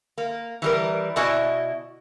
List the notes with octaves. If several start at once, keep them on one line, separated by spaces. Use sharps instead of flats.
A#3
E3 G3 A#4
B2 E4 F#4 D5 D#5 G#5